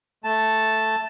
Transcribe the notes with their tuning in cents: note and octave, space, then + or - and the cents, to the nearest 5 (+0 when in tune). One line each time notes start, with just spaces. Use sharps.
A3 +0 A5 +0